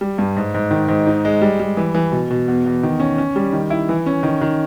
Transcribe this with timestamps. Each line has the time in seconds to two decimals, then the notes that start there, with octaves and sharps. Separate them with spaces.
0.01 G3
0.18 G2
0.37 G#2
0.54 G#2
0.71 D#3
0.88 G#2
1.07 D#4
1.25 G#3
1.42 G3
1.60 G3
1.77 E3
1.95 E3
2.12 B2
2.30 B2
2.48 E2
2.66 E2
2.83 D#3
3.00 C#4
3.18 C#4
3.36 G3
3.53 D#3
3.70 E4
3.89 E3
4.06 C#4
4.23 D#3
4.41 D#3